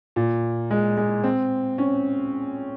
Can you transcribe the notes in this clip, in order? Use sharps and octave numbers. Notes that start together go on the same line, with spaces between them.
A#2
G#3
G#3
C4
C#4